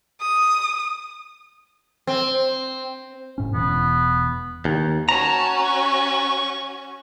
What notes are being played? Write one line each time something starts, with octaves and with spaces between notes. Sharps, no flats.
D#6
C4
F#1 A2 C#4
E1 E3 B3
D#2
C#4 F#4 A5 A#5
C#6